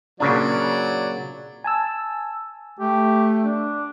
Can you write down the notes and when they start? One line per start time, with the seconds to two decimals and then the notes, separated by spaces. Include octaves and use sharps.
0.20 A#2 C#3 F#3 D4 D5
1.64 G#5 A5 E6
2.79 A3 G4
3.44 D4